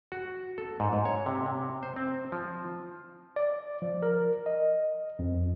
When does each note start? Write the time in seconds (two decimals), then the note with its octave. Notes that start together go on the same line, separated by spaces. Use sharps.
0.12 F#4
0.58 A4
0.80 G#2
0.93 G#2
1.05 C#5
1.26 C3
1.46 C3
1.83 C5
1.96 C4
2.32 F3
3.36 D5
3.82 F3
4.02 A#4
4.46 D#5
5.19 F2